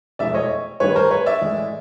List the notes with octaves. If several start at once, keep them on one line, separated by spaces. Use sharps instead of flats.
F1 E2 B2 G#3 D5 E5
C#5 D#5
A1 G2 D#3 G3 B4 C#5
A#4 C5
B4 C#5
D5 E5
A1 A2 E3 G#3